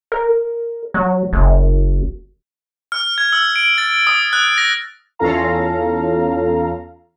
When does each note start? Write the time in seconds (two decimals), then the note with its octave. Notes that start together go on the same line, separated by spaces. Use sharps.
0.12 A#4
0.94 F#3
1.33 F#1
2.92 F6
3.18 G#6
3.33 E6
3.56 D7
3.78 A6
4.07 D#6
4.33 F#6
4.58 A#6
5.19 E2 C#4 F4 A4 F5 A#5